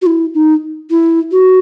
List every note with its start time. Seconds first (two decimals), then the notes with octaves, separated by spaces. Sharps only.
0.02 F#4
0.06 E4
0.34 D#4
0.91 E4
1.32 F#4